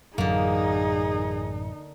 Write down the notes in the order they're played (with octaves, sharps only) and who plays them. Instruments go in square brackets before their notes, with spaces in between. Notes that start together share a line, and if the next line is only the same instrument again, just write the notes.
[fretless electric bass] A1 F#2 F#3 [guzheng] D3 A#3 [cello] D#4 [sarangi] G#4